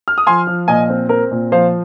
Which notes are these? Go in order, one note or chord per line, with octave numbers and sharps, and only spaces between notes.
F6
D#6
F3 G#5 C6
F3
A#2 D#5 G#5
C4
C4 A#4
A#2
F3 C5 F5